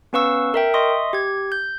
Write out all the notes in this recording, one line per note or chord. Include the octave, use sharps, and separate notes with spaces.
B3 C#4 B4 F5 C#6 E6
A#4 E5 G5
D#5 E5 C6 C#6 D#6
G4 G#6
G6